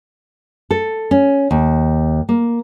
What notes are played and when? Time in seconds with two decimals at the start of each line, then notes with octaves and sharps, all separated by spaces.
0.71 A4
1.11 C#4
1.51 D#2
2.29 A#3